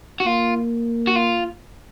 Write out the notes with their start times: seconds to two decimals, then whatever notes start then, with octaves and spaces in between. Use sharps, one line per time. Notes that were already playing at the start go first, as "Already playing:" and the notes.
0.20 F#4
0.25 A#3 F4
1.07 F#4
1.16 F4